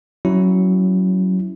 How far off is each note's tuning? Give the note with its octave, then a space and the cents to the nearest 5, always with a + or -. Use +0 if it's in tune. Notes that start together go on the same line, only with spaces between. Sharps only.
F#3 +10 C#4 +0 E4 +0